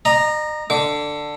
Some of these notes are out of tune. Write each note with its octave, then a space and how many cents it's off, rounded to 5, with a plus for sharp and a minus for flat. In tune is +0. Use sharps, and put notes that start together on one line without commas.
D#5 -40 A#5 +0
D3 +10 D6 -30